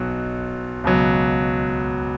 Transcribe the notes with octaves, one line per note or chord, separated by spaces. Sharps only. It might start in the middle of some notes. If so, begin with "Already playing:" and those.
Already playing: B1 B2 F#3
C#2 B2 F#3